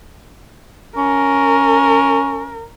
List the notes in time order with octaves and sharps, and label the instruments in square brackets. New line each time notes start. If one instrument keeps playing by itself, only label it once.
[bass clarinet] C#4 [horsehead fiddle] A#4